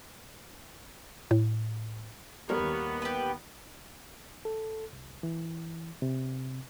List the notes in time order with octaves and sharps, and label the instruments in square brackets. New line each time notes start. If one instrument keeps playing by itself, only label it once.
[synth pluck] A2
[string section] D#2 B3 [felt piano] G3 A#4 [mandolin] C#5
[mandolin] G4 B4
[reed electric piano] A4
C2
E3
C3